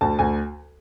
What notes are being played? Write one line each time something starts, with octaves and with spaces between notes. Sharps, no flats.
D2 A5
D2 G#5